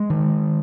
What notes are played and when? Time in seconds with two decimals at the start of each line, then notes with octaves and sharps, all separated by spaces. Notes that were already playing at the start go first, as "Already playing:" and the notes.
Already playing: G#3
0.10 D#3